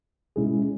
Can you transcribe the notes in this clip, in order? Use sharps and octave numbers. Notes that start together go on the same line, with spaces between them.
B2 G#3 C#4 E4 G#4